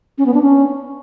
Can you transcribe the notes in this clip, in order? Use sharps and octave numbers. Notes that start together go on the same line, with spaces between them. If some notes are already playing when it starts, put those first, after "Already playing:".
C#4
B3
D4
C#4